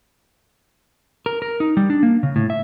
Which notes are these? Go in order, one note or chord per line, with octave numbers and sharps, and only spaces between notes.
A#4
A#4
D#4
G3
D4
A#3
C#3
A2
E5